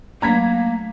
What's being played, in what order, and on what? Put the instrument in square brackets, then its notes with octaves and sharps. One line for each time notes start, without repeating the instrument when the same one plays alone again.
[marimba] F#3 A3 [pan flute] A#3 [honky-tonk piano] A#5 G#6 B6